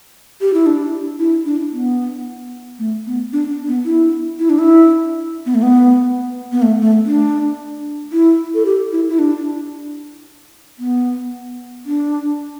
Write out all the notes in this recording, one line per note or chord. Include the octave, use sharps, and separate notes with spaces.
G4
E4
D4
E4
D4
B3
A3
B3
D4
D4
B3
E4
E4
D4
E4
B3
A3
B3
B3
A3
A3
D4
E4
A4
G4
E4
E4
D4
B3
D4